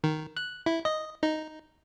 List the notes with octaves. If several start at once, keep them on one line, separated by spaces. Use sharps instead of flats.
D#3
F#6
E4
D#5
D#4